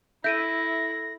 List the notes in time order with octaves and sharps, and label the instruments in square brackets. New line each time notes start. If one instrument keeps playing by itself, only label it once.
[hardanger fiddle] E4 [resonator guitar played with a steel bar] A4 E5 [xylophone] G6 D7 D#7 [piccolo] A#6